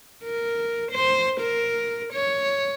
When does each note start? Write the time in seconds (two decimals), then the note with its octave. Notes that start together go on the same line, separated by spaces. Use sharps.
0.24 A#4
0.92 C5
1.41 A#4
2.13 C#5